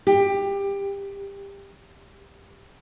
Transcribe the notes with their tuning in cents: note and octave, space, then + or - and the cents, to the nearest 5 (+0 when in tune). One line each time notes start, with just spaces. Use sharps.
G4 +20